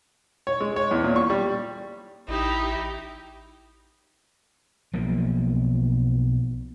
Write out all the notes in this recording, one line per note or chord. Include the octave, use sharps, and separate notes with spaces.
C#5
G#3
C#5
E2
A#2
C#6
G3
A1 D#4 E4 G4
B1 F3 A#3